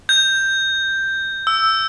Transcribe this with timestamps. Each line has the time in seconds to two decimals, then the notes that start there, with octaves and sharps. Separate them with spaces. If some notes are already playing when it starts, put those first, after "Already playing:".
0.09 G6
1.47 E6